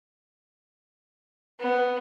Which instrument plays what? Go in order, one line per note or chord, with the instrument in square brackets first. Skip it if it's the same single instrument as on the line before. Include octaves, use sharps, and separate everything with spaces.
[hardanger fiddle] B3